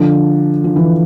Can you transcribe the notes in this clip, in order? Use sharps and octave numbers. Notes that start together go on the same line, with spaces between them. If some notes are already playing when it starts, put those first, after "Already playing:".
Already playing: D3 F3
F3
E3